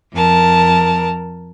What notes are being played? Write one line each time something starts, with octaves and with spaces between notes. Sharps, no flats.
F2 A#4 A5